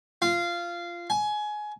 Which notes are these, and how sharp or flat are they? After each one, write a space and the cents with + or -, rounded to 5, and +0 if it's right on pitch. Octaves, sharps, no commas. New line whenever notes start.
F4 -15
G#5 +20